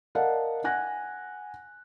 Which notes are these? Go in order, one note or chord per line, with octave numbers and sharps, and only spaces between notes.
A#4 D5 D#5 F5 F#5 A5
F#5 G#5 F#6 A#6